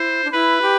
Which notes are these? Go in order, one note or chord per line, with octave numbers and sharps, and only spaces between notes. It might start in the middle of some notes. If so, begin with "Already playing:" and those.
Already playing: E4 C5
D4
E4 B4
G4